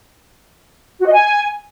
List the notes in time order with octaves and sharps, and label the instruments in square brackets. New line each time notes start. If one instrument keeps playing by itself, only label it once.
[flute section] F#4
D#5
G#5